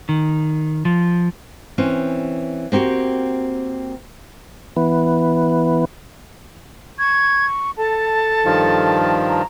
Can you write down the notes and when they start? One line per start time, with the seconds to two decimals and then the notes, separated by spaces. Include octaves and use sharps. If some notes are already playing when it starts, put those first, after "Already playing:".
0.09 D#3
0.85 F3
1.78 E3 C4 C#4
2.72 A#3 C4 F#4 G4
4.76 E3 B3
6.99 C#6 G#6
7.77 A4 A5
8.45 G2 D#3 F3
9.28 A#5